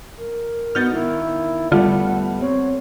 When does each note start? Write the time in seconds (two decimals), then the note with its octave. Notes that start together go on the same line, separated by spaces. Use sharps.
0.18 A#4
0.75 B3 D#4 F#4 F6 G6 A6
0.92 D#3 A#3 E4
1.72 E2 D3 G3 A3 F4 F#5
2.41 C4 C#5